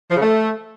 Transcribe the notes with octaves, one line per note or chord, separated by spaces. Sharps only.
F3
C#3
A3